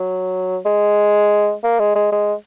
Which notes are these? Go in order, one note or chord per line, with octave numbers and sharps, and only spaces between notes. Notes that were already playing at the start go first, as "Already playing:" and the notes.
Already playing: F#3
G#3
A#3
G#3
G#3
G#3